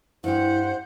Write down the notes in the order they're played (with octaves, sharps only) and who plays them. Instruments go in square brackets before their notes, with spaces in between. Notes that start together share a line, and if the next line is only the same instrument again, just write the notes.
[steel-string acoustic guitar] G2 G4 [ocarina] E4 [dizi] C5 [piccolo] F#5